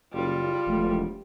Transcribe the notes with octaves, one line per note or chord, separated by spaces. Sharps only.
F#1 G3 F4
E1 F3 G#3 A3